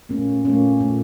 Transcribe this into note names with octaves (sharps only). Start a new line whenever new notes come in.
A#2 A3 A#3 C#4
A#2 A3 A#3 C#4
A#2 A3